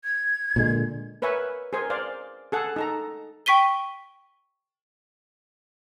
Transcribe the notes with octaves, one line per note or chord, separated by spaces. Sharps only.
G#6
A#2 D3 G#3
A#4 B4 C#5 E5 G#5 C#6
G#4 A#4 C5 G#5
C5 D5 F5
G#4 A4 F#5
D#4 A4 A#5
G5 C#6 B6 D#7 G7